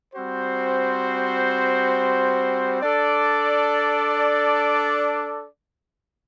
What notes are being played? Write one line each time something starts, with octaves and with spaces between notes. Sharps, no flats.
G3 C4 F#4 C5
D4 A4 D5